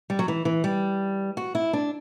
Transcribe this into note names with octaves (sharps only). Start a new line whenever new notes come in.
G3
F#3
E3
E3
G3
F#4
E4
D4